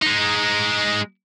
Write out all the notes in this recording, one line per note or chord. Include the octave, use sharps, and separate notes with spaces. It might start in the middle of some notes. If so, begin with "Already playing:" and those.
G#3 D#4